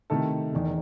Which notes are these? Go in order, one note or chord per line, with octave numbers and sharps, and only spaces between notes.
C3 D#3 A3 E4 A4
E1 E2 D#3